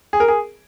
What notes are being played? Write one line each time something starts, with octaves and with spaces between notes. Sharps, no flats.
G#4
A#4
G#4